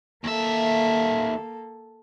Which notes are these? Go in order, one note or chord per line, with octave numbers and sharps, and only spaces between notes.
D#2 A#3 A4 E5